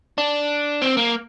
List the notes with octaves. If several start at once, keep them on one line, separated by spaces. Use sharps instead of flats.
D4
C4
A#3